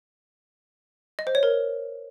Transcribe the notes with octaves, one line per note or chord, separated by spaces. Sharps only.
D#5
C5
C#5
A#4